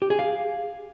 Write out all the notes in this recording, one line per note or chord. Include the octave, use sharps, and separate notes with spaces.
G4
G#4
F5